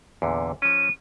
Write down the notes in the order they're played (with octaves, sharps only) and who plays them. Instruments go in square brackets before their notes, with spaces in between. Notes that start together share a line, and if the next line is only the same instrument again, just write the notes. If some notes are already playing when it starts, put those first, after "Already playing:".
[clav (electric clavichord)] E2 A#2 D3
[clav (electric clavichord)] F3 C#4 [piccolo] D#7